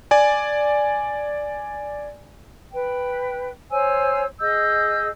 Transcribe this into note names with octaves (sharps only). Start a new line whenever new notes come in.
D5 G#5
B4 G5
C5 C#5 G#5 E6
G#4 D#5 E6 G6